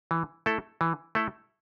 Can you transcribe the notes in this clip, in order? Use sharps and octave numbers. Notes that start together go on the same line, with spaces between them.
E3
A3 E4 A4
E3
A3 E4 A4